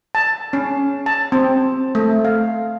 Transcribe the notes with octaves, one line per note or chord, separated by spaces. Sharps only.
A5
C#4
A5
C4
A3
F5